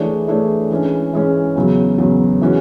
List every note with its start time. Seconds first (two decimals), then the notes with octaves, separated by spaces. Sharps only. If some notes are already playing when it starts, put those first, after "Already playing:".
Already playing: E3 A3 D4 G#4 C#5
0.28 E3 A3 D4 G#4 C#5
0.71 E3 G#3 C#4
1.13 E3 G#3 C#4
1.56 E2 C#3 F#3
1.98 E2 C#3 F#3
2.42 E3 G#3 C#4 F#4